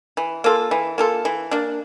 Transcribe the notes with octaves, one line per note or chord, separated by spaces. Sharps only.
E3
A#3 F4 A4
E3
A#3 F4 A4
E3
A#3 D4